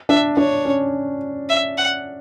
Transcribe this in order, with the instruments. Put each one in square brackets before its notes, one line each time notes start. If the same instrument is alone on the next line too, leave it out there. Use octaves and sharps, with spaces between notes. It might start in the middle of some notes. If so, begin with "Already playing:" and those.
[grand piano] D4 [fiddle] E5
[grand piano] D4 [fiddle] C#5
[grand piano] C#4
[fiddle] E5
F#5